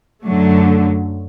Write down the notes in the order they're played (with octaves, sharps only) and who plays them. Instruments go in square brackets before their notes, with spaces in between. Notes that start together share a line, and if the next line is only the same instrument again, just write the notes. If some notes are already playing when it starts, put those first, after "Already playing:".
[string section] F#2 D3 F#3 A3